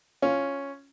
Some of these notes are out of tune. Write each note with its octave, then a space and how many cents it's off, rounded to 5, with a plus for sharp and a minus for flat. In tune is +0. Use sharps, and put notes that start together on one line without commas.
C#4 +0 F4 +0